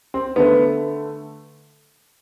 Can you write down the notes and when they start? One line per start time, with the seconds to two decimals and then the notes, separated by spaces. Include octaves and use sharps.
0.14 C4
0.36 D3 A3 B3